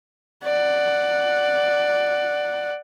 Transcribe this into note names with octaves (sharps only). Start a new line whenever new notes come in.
D5 F#5